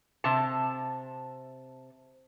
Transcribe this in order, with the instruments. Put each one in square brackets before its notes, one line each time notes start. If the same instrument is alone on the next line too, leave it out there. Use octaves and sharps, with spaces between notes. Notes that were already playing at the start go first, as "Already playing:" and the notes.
[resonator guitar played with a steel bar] C3 A5